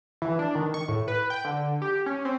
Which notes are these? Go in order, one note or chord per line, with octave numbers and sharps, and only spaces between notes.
E3
D4
D#3
C#6
A2
B4
G5
D3
G4
C#4
C4